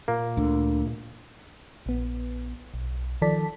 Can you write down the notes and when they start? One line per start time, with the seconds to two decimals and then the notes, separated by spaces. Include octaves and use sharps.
0.08 A#2 A#3
0.37 D2 D3
1.86 A#1 B3
2.74 B1
3.22 D#3 F3 A4 D5 A5 B6